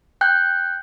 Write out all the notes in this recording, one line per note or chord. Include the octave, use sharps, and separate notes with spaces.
G5 F#6 G6